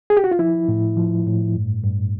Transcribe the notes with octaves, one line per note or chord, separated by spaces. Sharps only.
G#4
G4
F#4
F4
F3 E4
A2
F3
A2
G2
G2